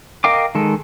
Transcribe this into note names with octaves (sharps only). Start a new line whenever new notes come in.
A#4 D#5 F5 G5 D6
D#3 G#3 A4